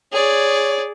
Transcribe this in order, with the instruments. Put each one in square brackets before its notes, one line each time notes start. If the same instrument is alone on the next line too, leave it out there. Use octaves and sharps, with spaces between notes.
[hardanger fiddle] G#4 D5 [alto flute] C#5